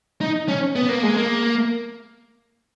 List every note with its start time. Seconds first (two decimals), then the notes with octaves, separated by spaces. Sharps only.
0.21 D#4
0.48 C#4
0.76 B3
0.89 A#3
1.03 G#3
1.17 A#3